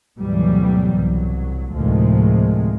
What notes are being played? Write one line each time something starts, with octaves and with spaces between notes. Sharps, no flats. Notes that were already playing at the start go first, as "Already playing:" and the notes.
D2 G#2 B2 E3 F#3 G3
C2 F#3
D2 A2 C3 D#3 F3 G#3